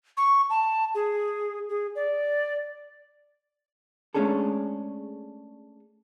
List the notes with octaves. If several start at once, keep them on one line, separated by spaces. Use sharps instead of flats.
C#6
A5
G#4
G#4
D5
G#3 A3 C#4 D4 G#4 A4